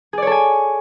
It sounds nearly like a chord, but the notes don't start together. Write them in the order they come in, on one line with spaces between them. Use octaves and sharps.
G#4 D5 C#5 A4 G#5